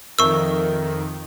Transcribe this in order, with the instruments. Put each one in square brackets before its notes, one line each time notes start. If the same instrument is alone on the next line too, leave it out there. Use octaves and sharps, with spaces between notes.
[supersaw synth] F2 D#3 [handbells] A#4 E5 A5 [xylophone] C#6 E6